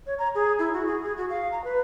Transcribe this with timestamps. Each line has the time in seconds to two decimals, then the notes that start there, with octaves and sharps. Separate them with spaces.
0.07 C#5
0.19 A#5
0.35 G#4
0.59 E4
0.74 F#4
0.87 G#4
1.03 G#4
1.17 F#4
1.30 F5
1.52 A#5
1.64 B4